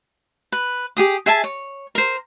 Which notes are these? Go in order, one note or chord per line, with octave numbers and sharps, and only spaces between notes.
B4
G4 G#4 D#6
G#4 E5 G#5 A5
C#5
A#4 C5